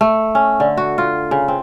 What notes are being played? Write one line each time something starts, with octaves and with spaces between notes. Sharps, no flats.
A3
C#4
D3
F#4
F4
C#3
C4